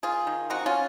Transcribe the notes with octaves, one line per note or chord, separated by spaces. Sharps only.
D#3 F4 G#4
D#3
C4 D#4 F#4
C#4 F4